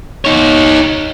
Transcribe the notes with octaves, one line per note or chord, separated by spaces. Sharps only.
D#4 C#5